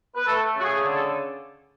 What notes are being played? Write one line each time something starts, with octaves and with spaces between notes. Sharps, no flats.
B4
A3 A4
C#3 F#4
G#4
D3 G#4
A4